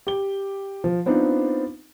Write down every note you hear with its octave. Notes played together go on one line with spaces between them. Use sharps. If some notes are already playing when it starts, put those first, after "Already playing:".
G4 G7
F3
B3 C4 D4 D#4 F4